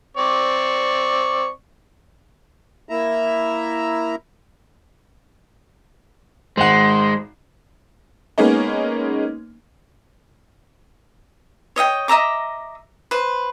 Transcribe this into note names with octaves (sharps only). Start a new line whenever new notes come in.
C4 D5 C#6
A#3 E4 E5 A#5
G#1 G#3 C5 F#5
G#3 A#3 B3 C#4 D#4
C#5 D#5 E5 G5
D#5 E5 A#5 D6
B4 C5